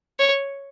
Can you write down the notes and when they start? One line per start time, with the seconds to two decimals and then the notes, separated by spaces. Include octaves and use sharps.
0.19 C#5